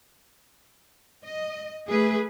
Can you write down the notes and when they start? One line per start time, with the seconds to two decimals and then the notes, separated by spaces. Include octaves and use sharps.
1.24 D#5
1.89 A3 G#4 B4